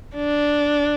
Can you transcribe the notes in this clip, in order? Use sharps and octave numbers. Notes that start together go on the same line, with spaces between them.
D4